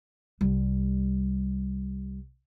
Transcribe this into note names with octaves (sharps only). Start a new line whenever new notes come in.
C2 G3